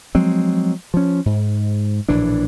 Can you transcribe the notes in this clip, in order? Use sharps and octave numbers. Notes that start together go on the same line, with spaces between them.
F3 F#3 G#3 C4
F3 C#4
G#2
A#1 A2 E3 D4